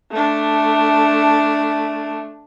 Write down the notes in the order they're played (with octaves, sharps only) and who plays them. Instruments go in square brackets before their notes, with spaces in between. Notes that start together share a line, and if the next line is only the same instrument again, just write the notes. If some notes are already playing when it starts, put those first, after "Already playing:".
[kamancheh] A3 D4